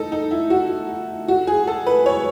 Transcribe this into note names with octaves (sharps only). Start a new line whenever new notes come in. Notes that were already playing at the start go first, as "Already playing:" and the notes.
Already playing: D#4 A4
D#4
E4
F#4
F#4
G#4
A4
B4
C#5